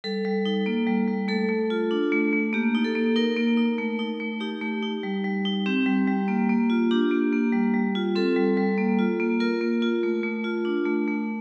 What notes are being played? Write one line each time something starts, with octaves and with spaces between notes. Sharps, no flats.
G3 A4
G3
D#4
A#3
G3
G3
A3 A4
A3
F4
D4
A3
A3
A#3 G4
D#4
A4
A#3
D#4 A#4
A#3
D#4
A3
D#4
A3
D#4 G4
A3
D#4
G3
G3
D#4
C4 G4
G3
G3
A#3
A#3
F4
D4 G4
A#3
A#3
G3
G3
F4
C4 A4
G3
G3
A#3
F4
A#3
F4 A#4
A#3
F4
A3
A3
F4
D4
A3
A3